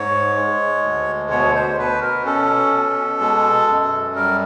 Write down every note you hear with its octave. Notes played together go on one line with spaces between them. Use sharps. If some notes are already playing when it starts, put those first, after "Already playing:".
Already playing: G#2 C#5
G#3
D2
B2 C#5
C5
B2 B4
A#4
C#4 A4
B2
G#3
F#2
G3 A#4